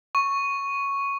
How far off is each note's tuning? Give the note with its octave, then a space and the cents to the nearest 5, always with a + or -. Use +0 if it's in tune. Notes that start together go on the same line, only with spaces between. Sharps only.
C#6 +0